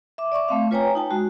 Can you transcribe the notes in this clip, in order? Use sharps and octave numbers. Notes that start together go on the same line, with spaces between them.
E5 D6
D5 E5 C#6 D6
A3 C4 F5
F4 B4 C#5 G5 G#5 A#5
D#4 G5 A5
G#3 F#4